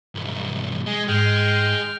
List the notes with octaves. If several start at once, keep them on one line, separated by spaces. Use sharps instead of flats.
B1 G2
G#3 G#4 G#6
G#2 G#3 G5 F6